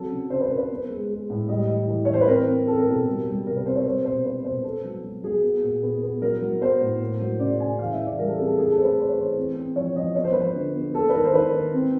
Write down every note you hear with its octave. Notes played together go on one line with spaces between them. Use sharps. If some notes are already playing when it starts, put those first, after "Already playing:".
Already playing: F#3 C4 A4
C#3
C#3 C5
B4
C#3 A#4
B4
B3
G#3
G#3
A2
G3 D#5
E3
E3
C#5
E3 C5
B4
C4 A#4
C4
C4 A4
A#4
B2 A4
G3
G3
C3 A#4
B4
C4 C5
C#5
G3 C5
B2 C5
A#3 B4
B2 C5
B3 A4
F#3
F#3
F#3 G#4
B3
A#2
B3
B3
F#3 A#4
F#3
B3 C5
A2
A#3
F#3
C#3 D5
C#3 G#5
E3 F5
E5
E3
D5
G3 A#4
A4
C4 G#4
A4
A3 G#4
A4
A3 C5
B4
A3 C5
C#5
E3 C5
C4
C4
F3 C#5
F3 D#5
B3 C#5
C5
F3 B4
C5
D3
B3
A#3 A4
B4
D#3 A#4
C5
D#3 B4
A#3
C4